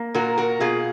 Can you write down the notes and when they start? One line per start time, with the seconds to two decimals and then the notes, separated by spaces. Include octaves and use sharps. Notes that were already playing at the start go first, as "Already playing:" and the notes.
Already playing: A#3
0.14 A#2 F#4 A#4
0.38 F#4 A#4
0.60 B2 F4 G#4